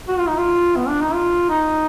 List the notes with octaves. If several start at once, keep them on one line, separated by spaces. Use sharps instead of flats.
F#4
F4
D#4
F4
B3
D4
D#4
F4
D#4